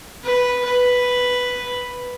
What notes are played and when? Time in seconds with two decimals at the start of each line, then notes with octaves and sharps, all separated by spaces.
0.24 B4
0.65 B4